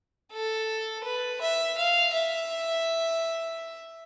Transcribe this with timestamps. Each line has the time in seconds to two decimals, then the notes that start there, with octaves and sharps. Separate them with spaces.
0.32 A4
1.04 B4
1.41 E5
1.78 F5
2.14 E5